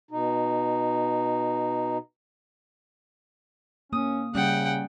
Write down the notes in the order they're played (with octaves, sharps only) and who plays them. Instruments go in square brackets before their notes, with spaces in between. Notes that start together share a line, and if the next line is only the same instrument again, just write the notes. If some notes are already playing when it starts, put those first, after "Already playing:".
[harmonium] B2 D#4
[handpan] A#3 [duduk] C#4 [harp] D#6
[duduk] C#3 [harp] G3 [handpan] C#4 [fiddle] F#5 G5